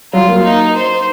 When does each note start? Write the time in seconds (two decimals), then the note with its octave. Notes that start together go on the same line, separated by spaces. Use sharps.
0.13 F#3 F4
0.28 A#3
0.44 D#4
0.75 C5